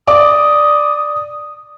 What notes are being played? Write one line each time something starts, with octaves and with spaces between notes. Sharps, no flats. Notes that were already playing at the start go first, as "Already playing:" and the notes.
D5 D6 D#6